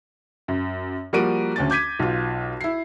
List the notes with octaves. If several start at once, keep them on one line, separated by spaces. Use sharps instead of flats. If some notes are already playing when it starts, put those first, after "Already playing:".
F#2
F3 G3 A#3 F#4 D7 D#7
D2 C#4 A6
D6 G6 G#6 B6 D#7
B1 F4
E4 C7